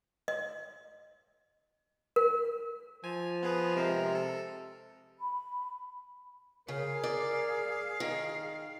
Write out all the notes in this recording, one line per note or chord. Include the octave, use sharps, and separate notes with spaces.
D#5
A#4
F3 G#5
B3 G#4 B4
C3 G#3 A#4
A4
B5
C#3 G#4 A#4 F5
D5
D#3